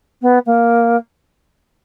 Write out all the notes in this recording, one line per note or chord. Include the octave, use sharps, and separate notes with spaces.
B3
A#3